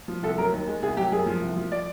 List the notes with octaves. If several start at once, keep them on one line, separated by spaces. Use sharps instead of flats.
F3
C2 A4
F#3 A#4
D#2
G#3
C2 G#4
F#3 G4
F#2 G#4
F3
C2
F3
D5